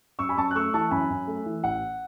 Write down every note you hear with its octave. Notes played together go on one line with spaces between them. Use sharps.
F#2 C#6 E6
G#5 B5
F#2 A5 C#6
F#6
A3 C#6 E6
E3 A5 C#6
F#2 G#5 B5
F#2
A3
E3
A1 F#5